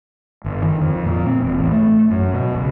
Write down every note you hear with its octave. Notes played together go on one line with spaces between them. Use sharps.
G1
D#3
F2
A#2
C4
E1
A1
A3
F#2
B2
C#2